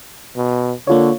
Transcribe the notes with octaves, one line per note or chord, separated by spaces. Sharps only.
B2
D3 A#3 F4 C#5